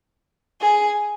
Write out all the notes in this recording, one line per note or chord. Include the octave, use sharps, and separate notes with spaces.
G#4